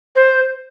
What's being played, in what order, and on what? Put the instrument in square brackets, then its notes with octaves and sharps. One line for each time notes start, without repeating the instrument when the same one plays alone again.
[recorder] C5